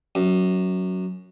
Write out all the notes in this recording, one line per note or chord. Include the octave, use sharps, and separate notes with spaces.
F#2